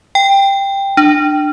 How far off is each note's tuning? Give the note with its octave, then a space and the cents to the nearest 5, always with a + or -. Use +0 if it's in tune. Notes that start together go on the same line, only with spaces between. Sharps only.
G5 +10
D4 +25